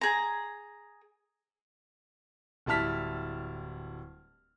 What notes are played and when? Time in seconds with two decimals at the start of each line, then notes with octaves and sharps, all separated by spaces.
0.01 G#4 A#5
2.66 D1 G3 E4 A5 F6 B6